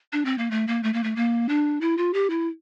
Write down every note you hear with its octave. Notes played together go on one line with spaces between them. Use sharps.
D4
C4
A#3
A3
A#3
A3
A#3
A3
A#3
D4
E4
F4
G4
E4